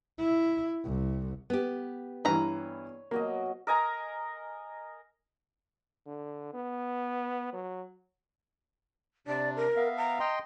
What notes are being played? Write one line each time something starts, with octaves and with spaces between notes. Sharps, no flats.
E4
C2
B3 G4
G2 E3 B4 C#5 A#5
B2 F#3 A#3 D#5
A#4 D#5 G#5 A#5
D3
B3
F#3
C3 D4 D5
A#4
B3 E5 F5
A#5
D#5 G5 C6